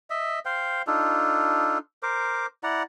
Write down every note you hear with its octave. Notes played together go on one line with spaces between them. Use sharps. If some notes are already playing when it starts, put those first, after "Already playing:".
D#5 E5
C5 F5 G5
D4 D#4 F4 A4
A#4 C5 D6
E4 D5 F#5 A#5